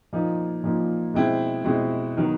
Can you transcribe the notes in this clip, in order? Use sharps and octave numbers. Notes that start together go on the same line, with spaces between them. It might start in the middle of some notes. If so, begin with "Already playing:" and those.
A#2 F3 A#3 D#4
A#2 F3 A#3 D#4
B2 G#3 C4 E4
B2 G#3 C4 E4
D#3 F#3 B3